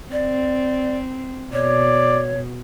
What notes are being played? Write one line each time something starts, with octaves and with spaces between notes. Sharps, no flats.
C4 D5
B2 C#5 D5